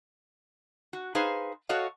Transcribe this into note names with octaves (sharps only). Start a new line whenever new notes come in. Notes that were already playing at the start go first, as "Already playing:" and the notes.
F#4
D#4 G#4 B4 C5 F5
F#4 A4 C#5 D#5 F5